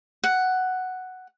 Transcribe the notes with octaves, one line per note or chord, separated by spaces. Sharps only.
F#5